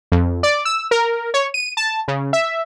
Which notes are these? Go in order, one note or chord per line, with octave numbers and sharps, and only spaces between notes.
F2
D5
E6
A#4
C#5
D#7
A5
C#3
E5